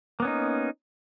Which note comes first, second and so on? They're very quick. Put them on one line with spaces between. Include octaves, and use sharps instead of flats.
A#3 B3 C#4 D#4